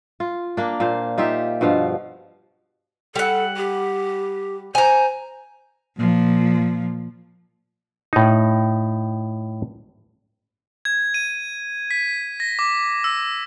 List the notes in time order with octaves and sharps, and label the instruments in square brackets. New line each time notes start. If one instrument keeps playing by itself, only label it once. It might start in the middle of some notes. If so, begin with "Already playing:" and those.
[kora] F4
A#3 D4
A#2 C5 F5
D#4 F4 G4 E5
G2 B2 F3 F5
[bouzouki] G3 F#5 [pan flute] A4
[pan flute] G4
[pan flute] C5 [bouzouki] G#5 A#5
[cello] A#2 F3
[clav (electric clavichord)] A2 D#4
[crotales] G#6
D#7
B6
A#6
D6
E6